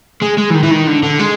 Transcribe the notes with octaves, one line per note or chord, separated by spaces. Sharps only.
G#3
G#3
E3
D#3
E3
D#3
D3
D3
G#3